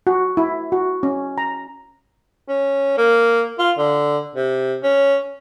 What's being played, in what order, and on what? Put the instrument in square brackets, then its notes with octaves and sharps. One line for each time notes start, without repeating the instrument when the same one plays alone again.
[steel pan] F#4
E4
F#4
C#4
A#5
[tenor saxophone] C#4
A#3
F4
D3
C3
C#4